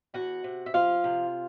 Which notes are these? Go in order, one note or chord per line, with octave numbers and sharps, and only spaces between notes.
E2 F#4 F#5
C3
E5
F3 F4 F5
C3